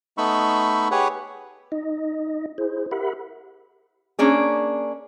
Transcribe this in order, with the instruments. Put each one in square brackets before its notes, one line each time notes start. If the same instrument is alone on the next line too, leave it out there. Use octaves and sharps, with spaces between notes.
[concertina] A3 B3 D#4 B5 C#6 E6
G4 G#4 B4 C#5 F#5
[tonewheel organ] D#4 D#5
E4 G#4 C5
G4 A#4 E5 F#5 B5
[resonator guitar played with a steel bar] A#3 C#4 D4 G#4